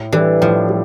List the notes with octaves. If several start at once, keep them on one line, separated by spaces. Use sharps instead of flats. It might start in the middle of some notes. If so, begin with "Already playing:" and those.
Already playing: A2
E3 G3 D4 A4
A2 F3
G3